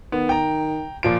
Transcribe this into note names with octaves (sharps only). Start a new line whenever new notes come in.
D#3 B3
G5 A#5
A#2 F3 D7